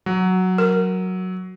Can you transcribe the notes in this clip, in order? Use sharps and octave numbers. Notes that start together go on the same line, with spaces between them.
F#3
A#4